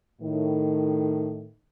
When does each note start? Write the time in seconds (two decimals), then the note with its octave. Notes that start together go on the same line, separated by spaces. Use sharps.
0.22 A2 D#3